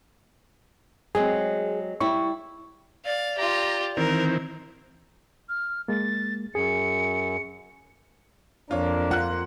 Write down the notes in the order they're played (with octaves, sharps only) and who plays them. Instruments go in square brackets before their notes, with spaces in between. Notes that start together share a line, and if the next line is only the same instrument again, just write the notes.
[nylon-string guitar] F#3 G#3 C4 [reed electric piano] G#4
[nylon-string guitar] G3 E4 [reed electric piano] C#6
[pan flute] D5 [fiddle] F5
[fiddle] F4 G4 [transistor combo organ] A#5
[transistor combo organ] D#3 E3 C4 [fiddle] A#4
[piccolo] F6
[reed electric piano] G#3 A#3 [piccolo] A6
[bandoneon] F#2 [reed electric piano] G#4 [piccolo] C#7
[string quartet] F2 A#3 [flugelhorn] D4 [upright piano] F4 C#5
[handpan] F4 [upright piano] F#5 F#6